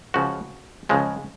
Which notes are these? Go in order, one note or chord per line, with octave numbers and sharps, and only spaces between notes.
C#2 C#3 F3 F#4
C#2 C#3 F3 G#3